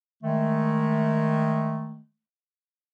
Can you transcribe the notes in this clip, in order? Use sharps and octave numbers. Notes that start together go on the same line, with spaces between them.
D#3 G#3 A3